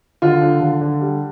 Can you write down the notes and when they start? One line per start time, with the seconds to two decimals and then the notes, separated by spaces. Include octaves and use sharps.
0.22 D3 F4
0.41 D3
0.61 D3
0.81 D3
1.01 G3